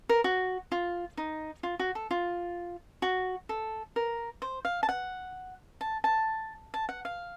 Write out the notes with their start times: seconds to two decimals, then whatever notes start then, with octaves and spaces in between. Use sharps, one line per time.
0.09 A#4
0.24 F#4
0.72 F4
1.18 D#4
1.63 F4
1.79 F#4
1.95 A4
2.11 F4
3.02 F#4
3.49 A4
3.96 A#4
4.42 C5
4.65 F5
4.83 A5
4.89 F#5
5.81 A5
6.04 A5
6.74 A5
6.89 F#5
7.05 F5